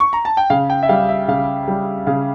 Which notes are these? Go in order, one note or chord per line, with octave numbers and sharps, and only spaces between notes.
C#6
A#5
A5
G5
C#3 F5
G5
E5
G3 F5
E5
C#3 F5
G3
C#3 F5